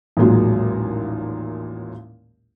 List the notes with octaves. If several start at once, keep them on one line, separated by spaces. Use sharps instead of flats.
A1 D#2 A#2 F#3 G#3